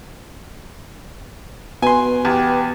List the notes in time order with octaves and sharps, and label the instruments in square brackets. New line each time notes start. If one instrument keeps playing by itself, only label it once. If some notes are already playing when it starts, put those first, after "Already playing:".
[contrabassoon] B2 [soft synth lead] B4 [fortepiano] G#5 C6
[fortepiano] E2 [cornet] G4